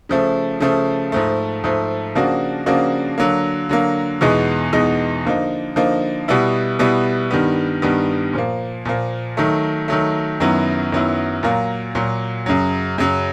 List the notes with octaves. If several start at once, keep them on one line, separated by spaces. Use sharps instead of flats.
C#3 F3 A3
C#3 F3 A3
G#2 F3 A3
G#2 F3 A3
C#3 F3 A#3 D4 F#4
C#3 F3 A#3 D4 F#4
D3 F#3 A#3
D3 F#3 A#3
E2 B2 G#3 B3 D#4
E2 B2 G#3 B3 D#4
D3 F3 A#3 D#4
D3 F3 A#3 D#4
B2 G3 B3 E4
B2 G3 B3 E4
G2 D#3 G3 B3
G2 D#3 G3 B3
A#2 F3 A#3
A#2 F3 A#3
D#3 F#3 A3
D#3 F#3 A3
F#2 D#3 F#3 B3 E4
F#2 D#3 F#3 B3 E4
A#2 F#3 A#3
A#2 F#3 A#3
F#2 C#3 F#3
F#2 C#3 F#3